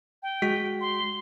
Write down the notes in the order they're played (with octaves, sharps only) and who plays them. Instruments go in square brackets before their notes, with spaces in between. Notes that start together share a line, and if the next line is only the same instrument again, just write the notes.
[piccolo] G5
[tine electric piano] G#3 F#4 B6
[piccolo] C6